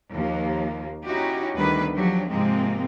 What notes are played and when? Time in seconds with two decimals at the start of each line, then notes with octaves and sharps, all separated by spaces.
0.13 D#2 F3 A#3
1.05 C#4 D#4 E4 F#4 G4
1.55 D2 D#3 G3 B3 B4
1.96 F3 F#3 D4 G4
2.30 G#2 C3 F3 G#3 A#3 C4